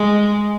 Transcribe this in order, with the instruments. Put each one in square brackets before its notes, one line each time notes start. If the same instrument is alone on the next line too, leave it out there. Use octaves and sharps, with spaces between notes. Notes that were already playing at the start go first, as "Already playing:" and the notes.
Already playing: [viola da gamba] G#3